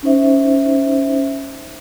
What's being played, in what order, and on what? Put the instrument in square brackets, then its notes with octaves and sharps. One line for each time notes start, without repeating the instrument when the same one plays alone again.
[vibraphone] C#4 D#4 C5 E5